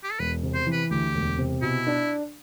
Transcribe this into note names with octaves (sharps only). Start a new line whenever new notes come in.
G4
A4
E1 B4
C3
C5
E3
B4
D2 G4
E1
C3
B2 E4
D4